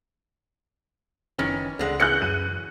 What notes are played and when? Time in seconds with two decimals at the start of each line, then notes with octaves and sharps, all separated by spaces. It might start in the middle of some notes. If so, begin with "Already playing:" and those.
1.39 F#1 D#3 E3 C#4
1.79 C#2 D3 G#3 F#5
2.00 C#3 E3 F#6 G6 C#7
2.22 F#2 D#7